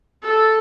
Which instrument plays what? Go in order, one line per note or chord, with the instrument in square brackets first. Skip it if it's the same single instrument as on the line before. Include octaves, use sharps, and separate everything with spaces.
[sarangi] A4